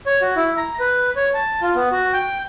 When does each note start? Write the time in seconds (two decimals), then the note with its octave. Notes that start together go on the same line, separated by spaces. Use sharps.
0.06 C#5
0.22 F#4
0.36 E4
0.57 A#5
0.80 B4
1.16 C#5
1.34 A5
1.62 F4
1.75 B3
1.92 F#4
2.13 G5